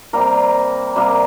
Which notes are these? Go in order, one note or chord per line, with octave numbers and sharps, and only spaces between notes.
C3 G3 A#3 A#4
C3 G3 A#3